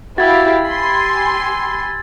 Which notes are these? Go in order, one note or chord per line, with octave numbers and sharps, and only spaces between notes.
E4 F#4 G4 F5 E6 G#6 A6
G4 G#5 B5 C6